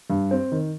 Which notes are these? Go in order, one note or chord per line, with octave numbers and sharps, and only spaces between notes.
G2
C4
D#3